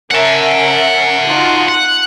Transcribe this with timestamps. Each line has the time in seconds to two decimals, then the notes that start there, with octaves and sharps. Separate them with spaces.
0.11 C#4 A#4 E5 F#5 A5
1.27 D#4 F4 F#4
1.68 F#5 F#6